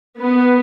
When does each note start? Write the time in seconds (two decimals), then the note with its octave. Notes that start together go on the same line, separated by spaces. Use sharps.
0.18 B3